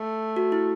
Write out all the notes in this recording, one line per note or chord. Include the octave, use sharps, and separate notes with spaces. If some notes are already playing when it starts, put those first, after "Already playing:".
Already playing: A3
F#4
E4